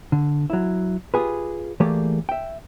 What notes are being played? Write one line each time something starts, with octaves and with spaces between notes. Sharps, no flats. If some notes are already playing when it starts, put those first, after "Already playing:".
D3
F#3 E4
F4 G4 G#4 B4
E3 A3 A#3 G4 G#4 D5
E5 G5